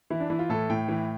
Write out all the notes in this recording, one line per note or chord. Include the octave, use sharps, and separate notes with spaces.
E3 E4
D4
E3 E4
F4
A2 A4
A2 G5
E3